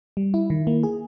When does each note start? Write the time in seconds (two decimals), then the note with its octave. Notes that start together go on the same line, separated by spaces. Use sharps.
0.17 G3
0.34 E4
0.50 D#3
0.67 A#3
0.83 G#4